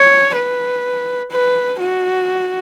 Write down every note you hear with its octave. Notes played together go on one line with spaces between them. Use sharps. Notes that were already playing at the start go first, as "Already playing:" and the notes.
Already playing: C#5
B4
B4
F#4